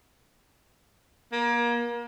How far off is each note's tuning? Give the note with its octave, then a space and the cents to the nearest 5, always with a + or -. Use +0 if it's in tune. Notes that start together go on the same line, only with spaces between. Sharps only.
A#3 +30